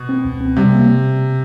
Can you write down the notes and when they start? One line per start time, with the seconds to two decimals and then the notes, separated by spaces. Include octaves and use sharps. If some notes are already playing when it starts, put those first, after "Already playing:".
Already playing: B2
0.09 C4
0.25 C#2
0.41 C4
0.57 C3 G3
0.73 A#3